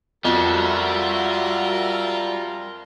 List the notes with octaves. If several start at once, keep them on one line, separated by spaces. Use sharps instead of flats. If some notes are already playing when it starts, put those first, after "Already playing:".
F2 G3 F4 F#4 A#4 E5